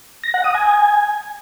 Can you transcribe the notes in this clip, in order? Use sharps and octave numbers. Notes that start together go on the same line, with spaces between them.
A#6
F#5
D#6
G#5